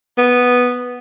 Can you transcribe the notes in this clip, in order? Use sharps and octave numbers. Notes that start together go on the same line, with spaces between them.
B3